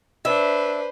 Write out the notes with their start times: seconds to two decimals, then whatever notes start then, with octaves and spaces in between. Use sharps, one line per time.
0.25 D4 B4 C5 E5